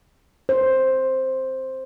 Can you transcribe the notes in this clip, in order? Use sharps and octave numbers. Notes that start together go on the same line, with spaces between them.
C5